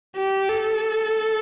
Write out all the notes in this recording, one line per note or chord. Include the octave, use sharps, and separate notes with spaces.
G4
A4